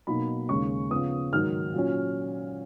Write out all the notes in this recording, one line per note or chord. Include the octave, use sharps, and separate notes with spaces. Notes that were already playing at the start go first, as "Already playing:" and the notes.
B2 F#3 A#3 D#4 B5
D#2 C#3 G#3 C#4 C#6
C#3 F3 B3 D#6
G#2 D#3 F#3 F6
A#2 F#3 C#4